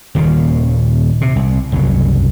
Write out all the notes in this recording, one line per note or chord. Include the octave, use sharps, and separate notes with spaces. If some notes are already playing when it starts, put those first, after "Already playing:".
D#1 D#2 A#2 C#3
C3
C2
F#1 C2 C#3 F#3